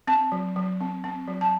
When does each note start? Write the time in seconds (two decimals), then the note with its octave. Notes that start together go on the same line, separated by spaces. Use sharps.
0.07 C4 A5
0.32 F#3
0.56 F#3
0.81 C4
1.04 C4
1.27 F#3
1.41 A5